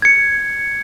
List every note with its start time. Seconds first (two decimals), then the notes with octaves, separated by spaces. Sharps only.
0.02 G#6 C#7